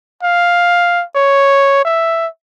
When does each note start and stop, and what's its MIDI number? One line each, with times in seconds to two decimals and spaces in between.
0.23 1.04 77
1.15 1.83 73
1.85 2.27 76